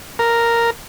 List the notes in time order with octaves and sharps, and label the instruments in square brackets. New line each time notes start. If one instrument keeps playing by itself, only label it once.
[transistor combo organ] A#4